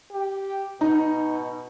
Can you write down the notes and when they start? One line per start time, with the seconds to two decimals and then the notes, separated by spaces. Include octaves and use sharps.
0.11 G4
0.81 B2 D#4